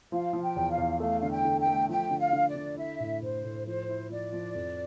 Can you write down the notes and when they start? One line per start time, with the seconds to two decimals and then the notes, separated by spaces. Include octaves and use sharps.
0.12 F3 F5
0.33 F3
0.41 G5
0.56 E2
0.70 F5
0.78 E2
1.00 A3 F5
1.19 D3 F5
1.30 G5
1.45 D3
1.60 G5
1.66 A3
1.89 F3 G5
2.11 D3
2.18 F5
2.33 D3
2.48 D5
2.55 D3
2.77 E4 E5
3.00 A2
3.22 A2 C5
3.44 A2
3.66 F3 C5
3.89 E4
4.10 F3 D5
4.33 F3
4.55 F2